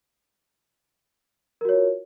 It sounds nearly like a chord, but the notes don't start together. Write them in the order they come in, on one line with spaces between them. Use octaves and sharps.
A#4 F#4 C#5 F4